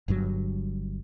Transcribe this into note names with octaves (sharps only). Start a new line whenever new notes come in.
G1 G2 C#3 F#3